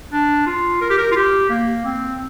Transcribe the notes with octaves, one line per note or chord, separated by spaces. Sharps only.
D4
F4
A#4
G4
A#4
F4
G4
A#3
C4